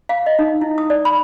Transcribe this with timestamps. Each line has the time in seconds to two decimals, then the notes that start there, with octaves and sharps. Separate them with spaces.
0.09 F5
0.26 D#5
0.39 D#4
0.61 E4
0.78 D#6
0.90 D5
1.05 B5